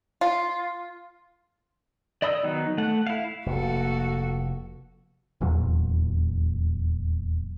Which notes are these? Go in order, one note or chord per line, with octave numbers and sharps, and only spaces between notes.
F4
D5 D#5 B5 D#6 E6
D#3 F#3 B3 D#4
A3 F#5
E4 F5
F1 A#3 F#4 A4
D#1 E2 A#2 F#3